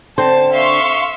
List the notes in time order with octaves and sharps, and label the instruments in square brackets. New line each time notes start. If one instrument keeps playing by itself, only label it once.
[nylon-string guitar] D3 C4 C5 [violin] A5
[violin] E5 [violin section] F5 C6 C#6